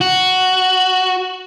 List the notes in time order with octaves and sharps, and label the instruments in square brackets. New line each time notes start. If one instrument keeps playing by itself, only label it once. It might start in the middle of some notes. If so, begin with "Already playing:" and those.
[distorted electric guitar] F#4